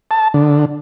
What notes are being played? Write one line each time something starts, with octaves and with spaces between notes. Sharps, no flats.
A5
D3